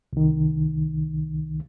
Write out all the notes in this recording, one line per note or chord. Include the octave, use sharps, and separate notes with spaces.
C2 D#3